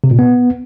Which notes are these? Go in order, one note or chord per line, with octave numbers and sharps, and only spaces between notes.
C3
A#2
B3